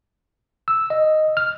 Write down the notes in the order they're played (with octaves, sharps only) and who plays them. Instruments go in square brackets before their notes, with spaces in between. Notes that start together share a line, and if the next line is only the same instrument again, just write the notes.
[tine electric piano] E6
D#5
F6